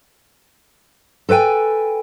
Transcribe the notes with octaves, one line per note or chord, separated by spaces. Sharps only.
A4 B4 C5 G5 G#5